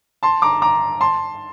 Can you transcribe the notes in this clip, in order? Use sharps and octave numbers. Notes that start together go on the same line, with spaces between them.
A5 C6
A#5 D6
A#5 D6
A5 C6